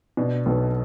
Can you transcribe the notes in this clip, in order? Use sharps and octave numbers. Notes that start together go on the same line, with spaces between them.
B2 D4
B1 B3